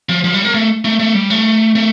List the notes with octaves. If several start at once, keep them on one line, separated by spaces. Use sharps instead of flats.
F3
F3
G3
A#3
A3
A3
A3
G3
A3
A3